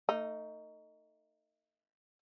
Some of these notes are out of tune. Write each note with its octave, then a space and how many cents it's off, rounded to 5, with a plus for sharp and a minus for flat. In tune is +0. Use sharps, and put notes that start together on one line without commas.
A3 +35 D#4 +0